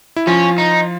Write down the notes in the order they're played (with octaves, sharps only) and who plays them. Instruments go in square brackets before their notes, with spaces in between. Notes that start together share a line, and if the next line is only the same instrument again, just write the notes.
[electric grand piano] E4
[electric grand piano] F3 F4 [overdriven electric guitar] C#4
[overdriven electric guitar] D#4